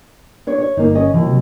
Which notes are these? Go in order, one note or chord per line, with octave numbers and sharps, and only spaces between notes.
D4 C#5
C#5
G1 A#3 D#4
C#4 D#5
D#2 E3 F3
C3 F#3